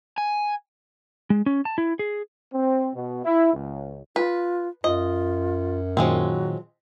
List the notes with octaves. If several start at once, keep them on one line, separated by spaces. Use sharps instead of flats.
G#5
G#3
C#4
A5
E4
G#4
C4
B2
E4
C#2
F4 B4
F#2 F4 D#5
A#2 D#3 F3 F#3 G#3 C4